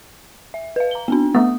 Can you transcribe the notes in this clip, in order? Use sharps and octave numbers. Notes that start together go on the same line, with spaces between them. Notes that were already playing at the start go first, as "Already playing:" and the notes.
E5
B4 F5
A#5 G7
B3 C4 D4
A3 B3 D#6